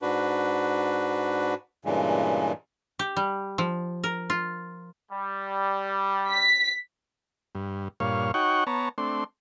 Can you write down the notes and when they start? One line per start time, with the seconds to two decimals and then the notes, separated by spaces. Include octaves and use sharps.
0.02 G#2 D4 F#4 B4
1.85 G2 A#2 C#3 E3 G#3
2.99 G4
3.17 G3
3.58 F3
4.04 A#4
4.30 F4
5.11 G3
6.29 B6
7.55 G2
8.00 G2 A#2 C#5 F5
8.34 D#4 F#4 C#5 F#5 G5 C#6
8.67 B3 C#5 A5 A#5
8.98 A3 C4 D4 C6